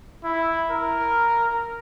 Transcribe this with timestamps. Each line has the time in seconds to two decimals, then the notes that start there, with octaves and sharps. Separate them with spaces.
0.24 E4
0.70 A#4